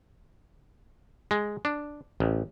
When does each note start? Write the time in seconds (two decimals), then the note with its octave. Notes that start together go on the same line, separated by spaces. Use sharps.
1.31 G#3
1.65 D4
2.20 A1